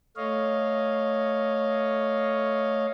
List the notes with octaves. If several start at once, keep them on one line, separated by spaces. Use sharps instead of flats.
A3 C#5 D#5 F5